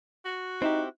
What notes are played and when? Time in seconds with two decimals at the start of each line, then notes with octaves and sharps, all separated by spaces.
0.25 F#4
0.62 C4 D#4 E4 G4